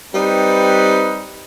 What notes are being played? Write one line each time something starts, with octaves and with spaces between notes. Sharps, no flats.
G3 C4 D#4 B4